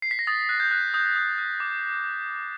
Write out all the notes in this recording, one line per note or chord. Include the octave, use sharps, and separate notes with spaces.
C7
B6
A#6
D#6 A6
F#6
G6
F#6
D#6 G6
D#6
F#6
D6